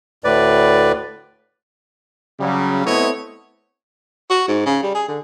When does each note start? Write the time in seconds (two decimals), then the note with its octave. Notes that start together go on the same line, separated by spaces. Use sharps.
0.24 D2 A2 B4 D5
2.40 C#3 F#3 G3
2.86 A3 B3 C4 E4 C#5 D#5
4.30 F#4
4.48 G#2
4.66 C#3
4.83 G3
4.95 G#4
5.08 D3